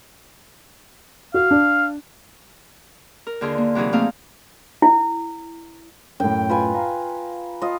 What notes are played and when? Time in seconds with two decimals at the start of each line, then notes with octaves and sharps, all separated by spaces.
1.34 F#4 F5
1.51 D4
3.27 A#4
3.41 D#2 D3 F4 G#4 C6
3.58 A#3
3.75 C3 E3 F#3 D#4 G#4
3.93 A3 A#3 C4 D#4 G#4 F5
4.82 E4
6.20 F#2 A2 G5
6.49 F4 B4 G#5
6.74 F5 A#5
7.62 F4 D#5